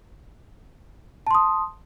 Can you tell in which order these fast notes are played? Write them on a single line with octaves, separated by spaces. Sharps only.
A5 C6 D#6